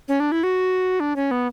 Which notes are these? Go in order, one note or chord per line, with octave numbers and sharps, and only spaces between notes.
C#4
D4
E4
F#4
D4
C#4
B3